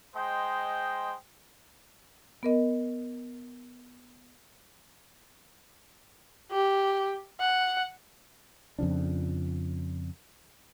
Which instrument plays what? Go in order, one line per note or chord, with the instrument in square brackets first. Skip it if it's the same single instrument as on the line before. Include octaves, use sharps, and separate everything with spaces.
[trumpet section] G#3 C5 D#5 G5
[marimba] B3 A#4 D#5
[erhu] G4
F#5
[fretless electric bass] F2 C#3 F3 D4